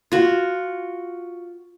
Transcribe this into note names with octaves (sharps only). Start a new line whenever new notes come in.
F4 F#4